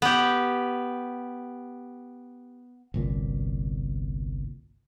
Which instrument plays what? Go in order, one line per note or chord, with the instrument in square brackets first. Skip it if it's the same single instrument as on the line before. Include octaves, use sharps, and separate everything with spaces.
[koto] B3 G4
[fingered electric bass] G1 C2 A#2